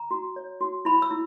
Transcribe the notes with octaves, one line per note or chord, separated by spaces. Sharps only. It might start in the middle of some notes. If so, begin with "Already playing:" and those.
Already playing: A#5
F#4
C#5
F#4
E4 B5
E6
E4